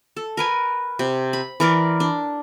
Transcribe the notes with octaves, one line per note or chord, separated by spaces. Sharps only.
A4
A#4 B4 G#5
C3
B5
E3 A#4 D5
D4